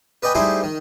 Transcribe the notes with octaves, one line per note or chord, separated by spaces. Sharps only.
B4 D5 D#5 G5 G#5 B5
G3 A3 D#4 E4 G#4 C5
D#3